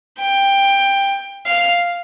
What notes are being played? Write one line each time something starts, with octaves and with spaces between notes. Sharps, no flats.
G5
F5